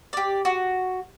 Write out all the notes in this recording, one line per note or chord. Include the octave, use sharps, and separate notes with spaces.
G4 D5
F#4